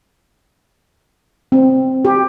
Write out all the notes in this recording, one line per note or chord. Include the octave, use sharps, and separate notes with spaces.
C4
G4